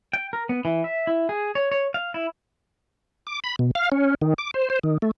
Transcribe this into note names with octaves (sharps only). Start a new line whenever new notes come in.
G5
A#4
B3
E3
E5
E4
G#4
C#5
C#5
F5
E4
D6
B5
B2
F5
C#4
D#3
D6
C5
C5
D#3
A3